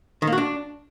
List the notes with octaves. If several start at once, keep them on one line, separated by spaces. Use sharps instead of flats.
D#3
A#3
F#4
D4